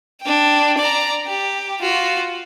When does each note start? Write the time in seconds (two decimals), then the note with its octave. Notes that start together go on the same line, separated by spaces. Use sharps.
0.22 D4 G5
0.79 D5 A#5
1.27 G4
1.81 F4 F#4